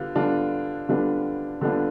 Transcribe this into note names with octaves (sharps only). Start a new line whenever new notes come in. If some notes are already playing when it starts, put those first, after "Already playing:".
Already playing: D3 G3 B3 F4
D3 G3 B3 D4 F4
D3 G3 B3 D4 F4
D3 G3 B3 D4 F4